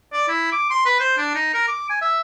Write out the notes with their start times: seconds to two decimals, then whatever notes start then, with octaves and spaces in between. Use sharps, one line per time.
0.13 D5
0.28 E4
0.52 D6
0.70 C6
0.85 B4
1.00 C5
1.18 D4
1.35 D#4
1.54 A#4
1.68 D6
1.90 G#5
2.02 E5